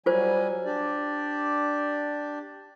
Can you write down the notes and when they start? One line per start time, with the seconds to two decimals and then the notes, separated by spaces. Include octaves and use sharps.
0.06 F#3 G3 F4 C5 G#5
0.65 D4 G4 D5